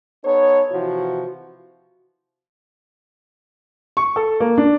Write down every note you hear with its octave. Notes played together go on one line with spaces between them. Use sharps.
B3 D#4 A4 C#5
C3 E3 F3 E4 F#4
C#6
A4
A#3
D4